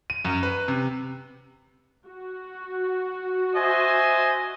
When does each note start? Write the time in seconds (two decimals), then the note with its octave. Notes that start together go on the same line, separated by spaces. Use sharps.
0.10 D#7
0.25 F#2
0.43 B4
0.68 C3
2.06 F#4
3.55 C5 D#5 E5 G#5